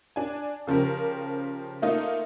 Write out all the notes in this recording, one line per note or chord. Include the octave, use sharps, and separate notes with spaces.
D4 G#5
C#3 F3 G4 A#4
A3 A#3 D#4 F4